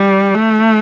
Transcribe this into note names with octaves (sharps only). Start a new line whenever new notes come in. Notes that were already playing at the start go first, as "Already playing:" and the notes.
Already playing: G3
A3